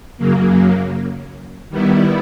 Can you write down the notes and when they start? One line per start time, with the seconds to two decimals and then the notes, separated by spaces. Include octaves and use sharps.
0.18 F#2 C#3 F#3 A#3
1.70 D#3 G3 B3 E4